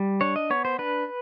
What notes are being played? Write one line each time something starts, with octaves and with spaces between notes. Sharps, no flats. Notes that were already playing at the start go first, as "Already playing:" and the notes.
Already playing: G3
D4 C#5
D#5
B3 C#5
C5
D4 B4